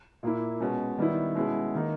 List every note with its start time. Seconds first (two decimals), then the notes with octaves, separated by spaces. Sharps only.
0.23 A#2 A#3 E4
0.61 B2 G#3 C#4
0.98 D#3 G3 B3 E4
1.35 B2 G#3 C#4 E4
1.75 D#3 A#3 D#4